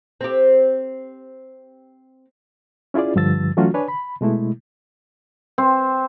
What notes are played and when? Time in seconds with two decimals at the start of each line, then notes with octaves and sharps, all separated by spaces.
0.21 C4 G4
2.94 C#4 E4 F4 G#4 D5
3.16 G2 D3 F3 E6 A6
3.57 E3 F#3 A3 C#4 F4 F#4
3.74 D4 B4 C#5 G#5
3.88 B5
4.21 B2 G#3 A3 E4
5.58 C4